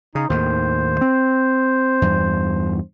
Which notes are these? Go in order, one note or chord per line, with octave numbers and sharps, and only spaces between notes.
C#3 D#4
D#2 A2 D#3 C5
C4
E2 G2